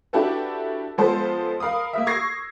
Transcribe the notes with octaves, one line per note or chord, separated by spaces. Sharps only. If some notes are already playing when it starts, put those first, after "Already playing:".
D4 E4 F#4 G4 A4 B4
F3 G#3 B3 A4 C5
A#4 F5 B5 D#6
A#3 A#4 E5
C#6 E6 G#6 A#6 C7